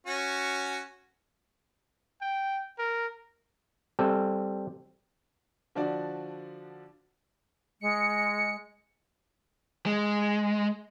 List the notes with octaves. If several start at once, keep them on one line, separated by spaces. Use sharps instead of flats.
C#4 F#4
G5
A#4
G3 C4 A4
D3 F3 D4 F#4 D5
G#3 C#7
G#3